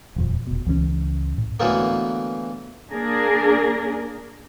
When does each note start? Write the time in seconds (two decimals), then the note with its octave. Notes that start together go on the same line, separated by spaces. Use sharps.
0.16 D#1 F2 F3
0.47 F1 B2
0.66 C#2 E3 G3 C#4
1.38 A2
1.60 B2 D3 E3 F#3 A3 A#3
2.90 A#3 D4 G#4 A#4